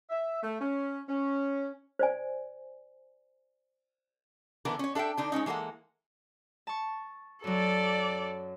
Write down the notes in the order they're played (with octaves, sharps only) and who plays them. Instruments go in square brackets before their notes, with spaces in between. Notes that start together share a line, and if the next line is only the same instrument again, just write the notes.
[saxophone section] E5
A3
C#4
C#4
[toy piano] C5 D5 G#5
[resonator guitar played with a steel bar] D3 E3 B3 A#4
C#4 C#5
D4 A4 E5 F#5 G5
D3 D4 D#4
G#3 A#3 C#4 D#4
E3 G#3 A#3 A4 F#5
[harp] A5 C#6
[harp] F#2 F#3 [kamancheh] A4 D5